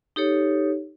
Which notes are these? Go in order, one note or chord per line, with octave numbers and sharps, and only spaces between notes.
D#4 G4 A4 C#5